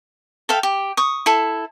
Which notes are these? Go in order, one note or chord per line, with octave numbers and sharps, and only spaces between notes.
A4 E5 F5 G5
G4
C#6 D#6
E4 A4